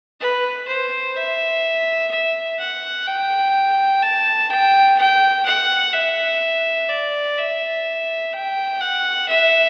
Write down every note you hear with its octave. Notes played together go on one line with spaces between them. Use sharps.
B4
C5
E5
E5
F#5
G5
A5
G5
G5
F#5
E5
D5
E5
G5
F#5
E5